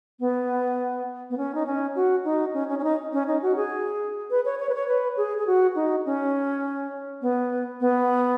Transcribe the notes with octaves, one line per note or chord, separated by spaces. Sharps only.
B3
B3
C#4
D#4
C#4
F#4
D#4
C#4
C#4
C#4
D#4
C#4
D#4
F#4
G#4
B4
C#5
C#5
B4
C#5
B4
G#4
G#4
F#4
D#4
C#4
B3
B3